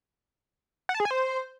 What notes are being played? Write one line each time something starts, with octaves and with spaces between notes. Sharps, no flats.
F#5
A5
G#4
G#5
C5